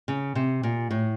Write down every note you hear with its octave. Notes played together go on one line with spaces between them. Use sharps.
C#3
C3
A#2
A2